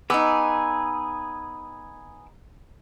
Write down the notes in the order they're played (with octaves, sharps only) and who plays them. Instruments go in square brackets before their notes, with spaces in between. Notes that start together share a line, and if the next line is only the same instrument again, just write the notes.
[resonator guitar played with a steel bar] B3 D#4 [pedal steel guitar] G#4 D6 E6